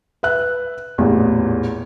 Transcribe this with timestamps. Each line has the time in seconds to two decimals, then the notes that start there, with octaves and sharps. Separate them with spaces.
0.23 B4 E5 F#6
0.98 A1 E2 A#2